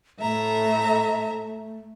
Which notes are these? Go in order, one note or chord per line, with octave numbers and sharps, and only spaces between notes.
A2 A3 E5 A#5